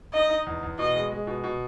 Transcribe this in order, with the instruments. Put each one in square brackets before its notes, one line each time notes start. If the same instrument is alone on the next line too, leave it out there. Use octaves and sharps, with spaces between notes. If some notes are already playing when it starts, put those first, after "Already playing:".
[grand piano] D#4 [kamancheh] D#5
[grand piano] D#4
E2
E2
[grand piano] B2 [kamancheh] D#5
[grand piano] G#3
G#3
B2
B2